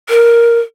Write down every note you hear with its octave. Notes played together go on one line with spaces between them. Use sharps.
A#4